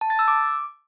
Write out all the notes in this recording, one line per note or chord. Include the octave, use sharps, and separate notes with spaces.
A5
A6
E6
D6